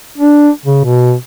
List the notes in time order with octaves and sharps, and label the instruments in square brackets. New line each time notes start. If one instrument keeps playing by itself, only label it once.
[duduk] D4
C#3
B2